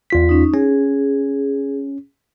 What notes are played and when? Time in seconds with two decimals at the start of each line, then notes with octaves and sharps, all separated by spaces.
0.10 E2 F4 B6
0.29 C#4 D#4
0.54 C#4 G#4